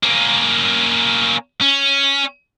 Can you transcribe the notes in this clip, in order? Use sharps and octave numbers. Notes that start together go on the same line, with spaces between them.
A#3 C#4
C#4